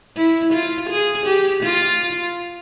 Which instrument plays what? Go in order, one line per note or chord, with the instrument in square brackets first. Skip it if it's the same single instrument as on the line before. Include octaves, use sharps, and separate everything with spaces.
[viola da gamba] E4
F4
G#4
G4
F4